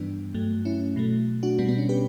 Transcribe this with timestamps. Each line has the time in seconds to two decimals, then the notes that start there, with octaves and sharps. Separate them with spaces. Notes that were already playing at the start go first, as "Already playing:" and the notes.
Already playing: G2 E3 G3 B3 D4
0.34 G2 F#3 A3
0.65 C#4 E4
0.96 B2 F#3 A3
1.43 D4 F#4
1.58 B2 G3 B3 D4
1.68 B3 D4
1.78 C#4
1.89 G4 B4